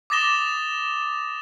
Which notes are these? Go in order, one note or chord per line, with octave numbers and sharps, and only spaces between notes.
D6 D#6 A6 A#6 E7 G7